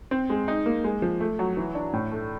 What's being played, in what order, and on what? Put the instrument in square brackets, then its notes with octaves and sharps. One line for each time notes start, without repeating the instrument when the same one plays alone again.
[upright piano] C4
G#3
D#4
A#3
G#3
F3
A3
F#3
E3
D4
A2
A3